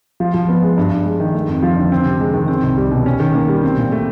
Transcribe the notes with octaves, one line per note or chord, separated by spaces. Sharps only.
F3
F3
B3
G#3
G2
G2
G#3
D#3
A3
F2
F3
D3
C4
C3
G#3
D#3
C4
C2
G3
B2
C#4
D#3
A#3
G3
C4
A#2
A3